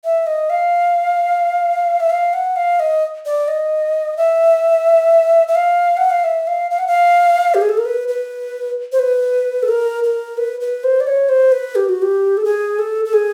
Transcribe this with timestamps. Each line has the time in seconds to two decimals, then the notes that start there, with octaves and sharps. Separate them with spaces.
0.04 E5
0.27 D#5
0.50 F5
2.00 E5
2.10 F5
2.33 F#5
2.56 F5
2.80 D#5
3.26 D5
3.48 D#5
4.17 E5
5.48 E5
5.55 F5
5.97 F#5
6.10 F5
6.24 E5
6.47 F5
6.71 F5
6.78 F#5
6.87 F5
7.54 G4
7.61 G#4
7.69 A4
7.77 A#4
7.85 B4
8.08 B4
8.92 C5
8.99 B4
9.63 A4
9.68 A#4
10.04 A#4
10.38 B4
10.60 B4
10.84 C5
11.00 D5
11.07 C#5
11.29 C5
11.52 B4
11.75 G4
11.89 F#4
12.02 G4
12.37 A4
12.45 G#4
12.79 A4
13.05 A4
13.13 G#4